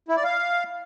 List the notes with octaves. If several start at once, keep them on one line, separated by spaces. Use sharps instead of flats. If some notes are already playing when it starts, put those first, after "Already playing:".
E4
D5
F5